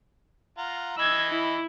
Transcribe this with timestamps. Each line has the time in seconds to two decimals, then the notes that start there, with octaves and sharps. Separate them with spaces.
0.58 F4 F#5 A#5
0.98 E3 D#5 B5 E6 G#6
1.30 E4